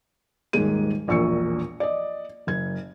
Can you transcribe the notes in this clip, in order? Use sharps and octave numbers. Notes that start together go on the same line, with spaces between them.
D#1 G#2 A#3 G#4 D#7
E1 A#1 A#2 C#6 E6 C#7
D5 D#5
F#1 G#6